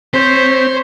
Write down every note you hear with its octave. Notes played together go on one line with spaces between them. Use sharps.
C4 C5 C#5 B6